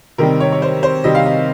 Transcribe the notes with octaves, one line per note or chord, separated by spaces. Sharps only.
C3 D#3 G3 C4 A#4
C#5
C#5
C5
C5
C3 D#3 G3 C4 D#5
F5
D#5